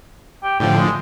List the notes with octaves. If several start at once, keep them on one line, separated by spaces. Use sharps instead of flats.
G4
A2 D3 F3 G4
G#3